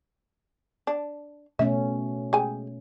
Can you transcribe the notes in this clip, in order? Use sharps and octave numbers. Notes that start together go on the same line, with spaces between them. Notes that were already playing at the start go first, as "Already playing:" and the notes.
D4
B2 A3 C#4 E5
G#3 G4 G#5